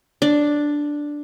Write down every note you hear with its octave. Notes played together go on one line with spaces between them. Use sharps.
D4